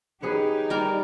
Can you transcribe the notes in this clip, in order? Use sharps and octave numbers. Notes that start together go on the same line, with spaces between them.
D#4 G4 G#4 B4 C#5
G3 A#4 D5